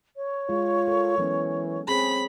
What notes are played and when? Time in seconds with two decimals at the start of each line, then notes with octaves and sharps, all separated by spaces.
0.16 C#5
0.49 G#3 F4
0.88 A4 A#4
1.18 E3 F#3 B3 C#4
1.88 C4 G#4 C#5 B5